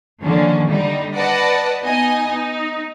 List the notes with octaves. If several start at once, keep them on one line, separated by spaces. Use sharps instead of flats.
D3 D#3 F3 A#3 C#4
D3 G3 D#4
B4 D5 D#5 F#5 A5
B3 D#4 D#5 G#5
D#4